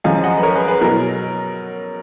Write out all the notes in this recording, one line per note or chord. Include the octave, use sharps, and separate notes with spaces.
F#2 F3 G#3 F5 G#5
D#5 F#5
B4
A#4 C#5
G#4 B4
G#4 B4
B2 F#3 A#4